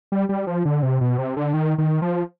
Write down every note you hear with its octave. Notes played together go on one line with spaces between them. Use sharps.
G3
G3
F3
D3
C3
B2
C3
D3
D#3
D#3
F3